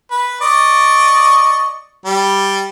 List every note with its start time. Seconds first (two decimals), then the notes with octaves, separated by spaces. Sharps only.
0.11 B4
0.41 D5 D#5 C#6
2.05 G3